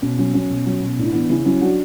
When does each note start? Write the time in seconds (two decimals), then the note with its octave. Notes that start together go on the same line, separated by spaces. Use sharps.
0.02 B2 C#4
0.18 F#3 C#4
0.34 F#3 C#4
0.50 B2
0.66 F#3
0.82 B2
0.98 A2 D4
1.05 E4
1.12 E3 B3 D4
1.30 C#3 C#4 E4
1.45 F#3 C#4 E4
1.61 F#3 D4 F#4